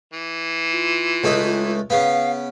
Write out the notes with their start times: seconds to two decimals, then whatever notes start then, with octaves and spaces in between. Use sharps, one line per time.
0.13 E3
0.72 F4
1.24 C#2 A3 D#4
1.90 C#3 B3 F5